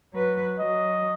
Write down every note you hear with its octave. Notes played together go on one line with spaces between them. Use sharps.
F#3 B4
F#3 D#5